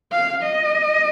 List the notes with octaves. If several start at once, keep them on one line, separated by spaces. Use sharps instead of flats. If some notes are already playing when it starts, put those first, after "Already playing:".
F5
D#5